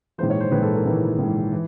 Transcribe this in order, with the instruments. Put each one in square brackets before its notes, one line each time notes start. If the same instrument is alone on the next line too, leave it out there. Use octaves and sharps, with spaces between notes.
[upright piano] A#1 G#2 E3 C5
C#5
C5
A#1 G#2 E3 B4
A4
A#4
A#1 G#2 E3
A#1 G#2 E3
E3